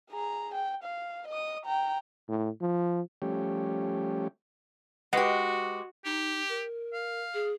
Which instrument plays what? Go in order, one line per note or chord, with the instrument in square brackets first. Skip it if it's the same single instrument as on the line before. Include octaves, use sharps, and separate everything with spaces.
[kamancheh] G#4 A#5
G5
F5
D#5 D#6
G5 A#5
[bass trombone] A2
F3
[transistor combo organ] F3 G3 A3 C#4 G4
[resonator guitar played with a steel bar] G#3 G4 [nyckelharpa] F#4 [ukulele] B4 F#5
[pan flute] D#4 [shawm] G4
[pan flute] A#4
[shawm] F5
[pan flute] G#4